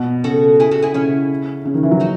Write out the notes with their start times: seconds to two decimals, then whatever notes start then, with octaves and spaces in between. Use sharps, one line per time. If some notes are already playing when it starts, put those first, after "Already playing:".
Already playing: B2
0.24 C#3 F#4 A4
0.60 E4 G#4
0.71 F#4 A4
0.82 E4 G#4
0.94 C#3 C#4 E4
1.65 C#3
1.74 D#3
1.83 E3
1.91 F#3
2.00 D#4 F#4